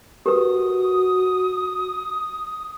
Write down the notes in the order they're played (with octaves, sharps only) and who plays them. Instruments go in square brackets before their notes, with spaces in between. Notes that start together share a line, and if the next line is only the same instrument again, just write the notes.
[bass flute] F#4 [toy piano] G4 A#4 B4 [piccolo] D#6